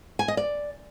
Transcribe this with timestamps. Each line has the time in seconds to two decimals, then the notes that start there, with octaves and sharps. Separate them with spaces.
0.19 G#5
0.28 D#5
0.37 D5